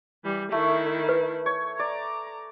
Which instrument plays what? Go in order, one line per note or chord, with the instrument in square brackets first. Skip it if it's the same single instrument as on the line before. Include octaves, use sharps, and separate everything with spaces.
[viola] E3 G3
[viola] D#3 E4 [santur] A3
[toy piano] B4
[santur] C#5
[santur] D5 [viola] A#5